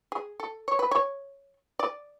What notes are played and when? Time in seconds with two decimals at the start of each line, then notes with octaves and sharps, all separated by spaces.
0.12 G#4
0.40 A4
0.68 C#5
0.79 B4
0.91 C#5
1.79 D5